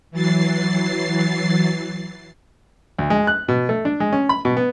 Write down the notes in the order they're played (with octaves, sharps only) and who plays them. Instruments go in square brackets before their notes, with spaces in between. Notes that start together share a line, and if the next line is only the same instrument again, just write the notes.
[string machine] E3 F#3 A6 C7
[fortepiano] D2
G#3
F#6
B2
A3
D4
G#3
C#4
B5
B2
B3